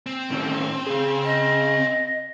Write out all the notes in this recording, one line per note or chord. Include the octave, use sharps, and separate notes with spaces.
C4
A2 D#3 C#4
C#3 G#4
D#5